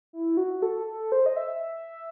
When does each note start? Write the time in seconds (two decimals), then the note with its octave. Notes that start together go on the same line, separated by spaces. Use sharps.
0.13 E4
0.37 F#4
0.62 A4
0.87 A4
1.12 C5
1.26 D#5
1.36 E5